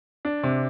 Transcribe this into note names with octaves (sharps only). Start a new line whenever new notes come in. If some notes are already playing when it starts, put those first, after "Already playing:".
D4
C3